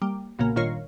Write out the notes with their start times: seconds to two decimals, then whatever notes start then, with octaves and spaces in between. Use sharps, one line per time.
0.02 G3 A#3
0.39 B1 A#2 C#3 A#3
0.56 G1 A#2 D#3 F4 C#5 A#6